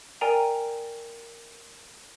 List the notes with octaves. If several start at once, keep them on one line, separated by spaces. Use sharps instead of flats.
A#4 D5 G5 G#5 A#5